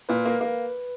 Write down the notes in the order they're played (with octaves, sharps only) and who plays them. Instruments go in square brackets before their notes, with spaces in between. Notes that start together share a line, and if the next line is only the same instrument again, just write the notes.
[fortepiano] A#2 [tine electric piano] B4
[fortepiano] A#3
A#3